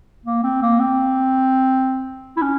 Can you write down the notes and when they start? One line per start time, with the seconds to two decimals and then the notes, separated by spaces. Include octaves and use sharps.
0.26 A#3
0.43 C4
0.62 A#3
0.79 C4
2.36 E4
2.42 C#4